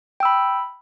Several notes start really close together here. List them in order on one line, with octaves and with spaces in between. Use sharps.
G5 E6 B5